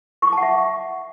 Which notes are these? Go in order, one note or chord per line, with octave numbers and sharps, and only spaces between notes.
C#6
D6
A5
F#5
E5